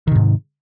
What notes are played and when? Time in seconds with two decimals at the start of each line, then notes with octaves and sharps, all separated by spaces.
0.07 D#3
0.11 C3
0.15 G#2